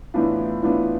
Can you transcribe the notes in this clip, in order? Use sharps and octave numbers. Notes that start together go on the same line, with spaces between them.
A2 E3 B3 D4 F4
A2 E3 B3 D4 F4